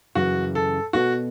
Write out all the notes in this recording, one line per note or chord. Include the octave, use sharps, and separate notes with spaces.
F#2 C#3 E3 F#4
A4
B2 B3 F#4 A4 C#5